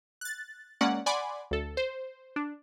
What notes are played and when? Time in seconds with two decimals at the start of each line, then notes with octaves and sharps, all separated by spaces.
0.21 F#6 A6
0.81 G#3 A#3 C#4 D5 F#5
1.06 D5 F#5 G#5 B5 C6 D6
1.51 D2 A4
1.77 C5
2.36 D4